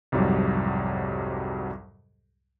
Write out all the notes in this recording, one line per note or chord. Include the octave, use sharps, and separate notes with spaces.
C2 F2 G#2 F#3 G3